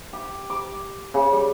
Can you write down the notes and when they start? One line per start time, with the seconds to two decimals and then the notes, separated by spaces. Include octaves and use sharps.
0.13 G4
0.50 D6
1.14 C#3
1.33 G3